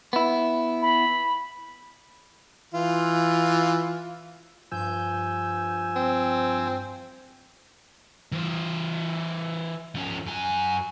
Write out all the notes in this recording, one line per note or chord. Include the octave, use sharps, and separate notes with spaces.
B3 E4
B5
E3 F4
G2 F3 G#5 E6 G6
C4
E3 C5
F3 C#4
F#2 G#5